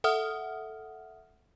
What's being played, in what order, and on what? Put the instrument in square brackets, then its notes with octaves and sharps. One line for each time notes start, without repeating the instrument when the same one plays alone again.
[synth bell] A4 E5 F#5 D#6 F6